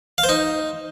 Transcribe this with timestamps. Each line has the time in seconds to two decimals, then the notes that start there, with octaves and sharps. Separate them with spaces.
0.18 F5
0.24 C5
0.29 D#4